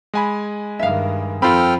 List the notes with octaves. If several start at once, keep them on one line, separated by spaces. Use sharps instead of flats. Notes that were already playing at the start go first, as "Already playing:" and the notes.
G#3 G#5 B5
G2 D#3 E5 F5
F2 C4 F4 A4 G5 B5 C6 F6